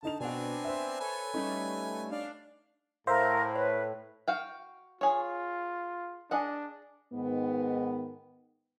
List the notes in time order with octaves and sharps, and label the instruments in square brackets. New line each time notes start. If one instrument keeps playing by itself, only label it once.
[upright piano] D3 D#4 F7 [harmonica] A5
[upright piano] B2 F#4 [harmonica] B3 C4 G#5 [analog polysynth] D4
[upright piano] C5 E5
[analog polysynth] A4 C#5 [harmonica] B4 G#5
[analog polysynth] G3 A3 [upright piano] C#4 D#4
[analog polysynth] D4 [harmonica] F5
[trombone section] A2 [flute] A#4 [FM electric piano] C5 E5 [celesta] F5
[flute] B4 [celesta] C#5
[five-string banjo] F#4 F5 G5
[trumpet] F4 [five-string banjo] G#4 C#5
[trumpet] D4 [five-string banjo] G#4 D#5 F#5
[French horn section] G#2 D#3 B3